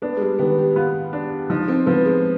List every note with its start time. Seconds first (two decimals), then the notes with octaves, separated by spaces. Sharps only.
0.02 B3 D4
0.17 G#3
0.21 G3
0.39 D#3 B3
0.58 G4
0.76 B3 F4
1.13 D4
1.50 F3 D#4
1.68 C4
1.86 F3 B3
2.05 G#3